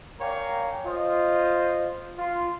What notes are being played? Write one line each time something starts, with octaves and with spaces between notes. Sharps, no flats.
A#4 C#5 D5 F5 G5 G#5
F4 C5 D#5
F4